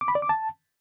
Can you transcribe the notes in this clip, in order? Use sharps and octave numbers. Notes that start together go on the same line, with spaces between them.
D6
B5
D5
D6
A5